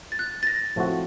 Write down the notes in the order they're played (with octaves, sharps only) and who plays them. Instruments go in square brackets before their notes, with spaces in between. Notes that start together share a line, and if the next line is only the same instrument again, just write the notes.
[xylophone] A6
F#6
A6
A#6
[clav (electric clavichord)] A2 F3 A3 C4 F#4